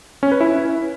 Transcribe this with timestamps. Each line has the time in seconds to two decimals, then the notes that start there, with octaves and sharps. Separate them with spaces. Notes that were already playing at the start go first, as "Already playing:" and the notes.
0.23 C#4
0.32 B4
0.41 E4